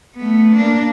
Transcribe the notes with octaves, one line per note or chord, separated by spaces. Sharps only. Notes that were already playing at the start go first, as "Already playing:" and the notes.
A3 B3
A#3 D4